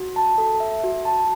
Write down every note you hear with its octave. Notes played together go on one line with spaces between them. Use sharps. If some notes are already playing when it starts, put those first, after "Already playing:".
Already playing: F#4
A5
A4
E5
F#4
A5